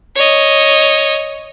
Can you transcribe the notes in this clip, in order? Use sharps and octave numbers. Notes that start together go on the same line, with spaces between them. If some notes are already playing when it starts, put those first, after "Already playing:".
C#5 D#5